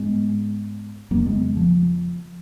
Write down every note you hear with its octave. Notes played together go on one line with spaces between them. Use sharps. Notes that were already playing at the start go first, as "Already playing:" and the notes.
Already playing: G#2 G#3 B3
F2 C#3 F#3 A#3
G#3 B3
F3